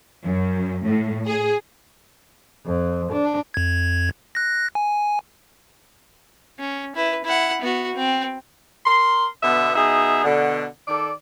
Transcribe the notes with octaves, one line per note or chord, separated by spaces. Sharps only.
F#2
A2
G#4
F2
D4
F2 G#6
F#6 A#6
G#5
C#4
E4 B4
E4 F#5
B3 F#4
C4
A#4 C6
B2 D3 B3 E5
B2 D#4 G#4 E5
B2 D3
D#3 A4 D5